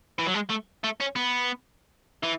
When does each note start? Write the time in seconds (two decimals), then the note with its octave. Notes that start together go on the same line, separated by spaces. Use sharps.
0.19 E3
0.27 F#3
0.34 G#3
0.49 A3
0.84 A3
1.00 C#4
1.16 B3
2.23 E3